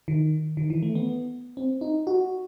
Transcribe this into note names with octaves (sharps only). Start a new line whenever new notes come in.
D#3
D#3
E3
A3
B3
C4
D#4
F#4